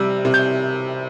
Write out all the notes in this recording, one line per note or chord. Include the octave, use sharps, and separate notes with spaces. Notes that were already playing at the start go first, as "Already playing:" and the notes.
Already playing: C3 G3 E6
C3
G6